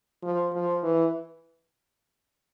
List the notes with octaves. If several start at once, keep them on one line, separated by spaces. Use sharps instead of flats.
F3
F3
E3